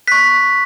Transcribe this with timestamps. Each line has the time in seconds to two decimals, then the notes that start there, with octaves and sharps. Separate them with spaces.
0.07 C#6 F#6 B6